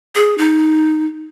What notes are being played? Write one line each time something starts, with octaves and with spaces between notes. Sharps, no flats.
G#4
D#4